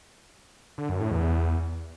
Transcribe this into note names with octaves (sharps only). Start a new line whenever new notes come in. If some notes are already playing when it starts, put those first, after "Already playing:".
D3
F#2
A2
E2